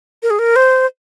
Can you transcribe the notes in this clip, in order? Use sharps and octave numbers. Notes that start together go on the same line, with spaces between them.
A#4
G#4
A#4
C5